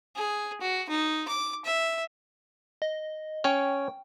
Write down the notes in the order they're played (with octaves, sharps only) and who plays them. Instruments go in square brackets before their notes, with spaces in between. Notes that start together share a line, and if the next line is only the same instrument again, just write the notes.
[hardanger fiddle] G#4
F#4
D#4
D6
E5
[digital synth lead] D#5
[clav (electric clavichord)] C#4 C#5 [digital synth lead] G5